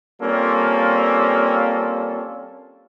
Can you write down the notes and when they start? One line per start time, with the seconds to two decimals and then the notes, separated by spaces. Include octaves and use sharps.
0.22 G3 A#3 C4 C#4 F4 A4